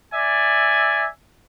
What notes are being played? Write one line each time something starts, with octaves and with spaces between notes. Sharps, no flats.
D5 E5 G#5